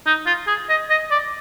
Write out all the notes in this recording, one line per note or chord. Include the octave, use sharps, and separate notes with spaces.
D#4
F4
G#4
D#5
D#5
D5